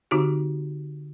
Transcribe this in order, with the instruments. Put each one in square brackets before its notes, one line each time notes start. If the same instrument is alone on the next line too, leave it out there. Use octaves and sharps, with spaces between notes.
[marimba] D3 C4 D#4 F#4 G4